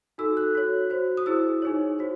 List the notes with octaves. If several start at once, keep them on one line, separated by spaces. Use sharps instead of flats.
D#4 F#4 A4 E6
F#6
F#4 C#5
F#4 C5
D#6
E4 G#4 C5 E6
D#4 G#4 C#5
F#4 C5